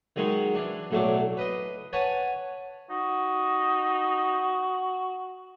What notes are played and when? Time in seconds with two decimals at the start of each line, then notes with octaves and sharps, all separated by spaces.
0.16 D#3 F#3 G#3 D#4
0.55 E3 D4
0.91 B1 A2 F#3 A3 D4 D6
1.37 B4 D#5 C6
1.93 B4 C#5 F#5 G#5 A5
2.90 D#4 F#4